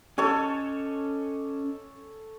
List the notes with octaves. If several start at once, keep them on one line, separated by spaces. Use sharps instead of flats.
C#4 A4 C#5 D#5 G#5